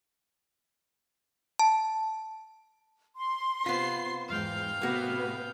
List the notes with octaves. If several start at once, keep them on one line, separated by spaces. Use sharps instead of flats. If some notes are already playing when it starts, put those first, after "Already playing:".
A5
C6
C3 B3 F4 C5 C7
E2 G#2 F5 G5
A2 C3 A#3 B3 F#4 B4